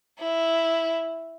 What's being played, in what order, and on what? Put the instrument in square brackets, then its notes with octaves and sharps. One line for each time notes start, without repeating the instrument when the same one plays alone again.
[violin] E4